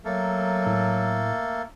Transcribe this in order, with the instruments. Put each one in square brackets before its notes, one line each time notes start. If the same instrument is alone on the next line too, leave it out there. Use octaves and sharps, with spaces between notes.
[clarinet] F#3 [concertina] A3 A#3 A4
[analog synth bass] A2